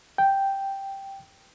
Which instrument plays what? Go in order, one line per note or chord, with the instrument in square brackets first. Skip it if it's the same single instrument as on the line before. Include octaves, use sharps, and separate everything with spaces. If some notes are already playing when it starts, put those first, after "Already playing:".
[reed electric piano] G5